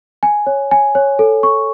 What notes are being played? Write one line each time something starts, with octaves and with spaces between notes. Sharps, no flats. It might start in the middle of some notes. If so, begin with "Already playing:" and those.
G#5
C#5
G#5
C#5
A4
C#6